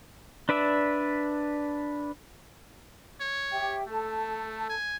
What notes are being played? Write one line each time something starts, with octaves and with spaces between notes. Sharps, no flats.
D4 B4 D5 E5
C#5
G4 E5 G5
A3 A4 A5
G#5